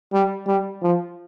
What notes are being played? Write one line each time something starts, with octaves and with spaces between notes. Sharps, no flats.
G3
G3
F3